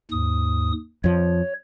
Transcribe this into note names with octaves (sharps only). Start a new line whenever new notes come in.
D#2 G#2 D#6
F2 F3 C#5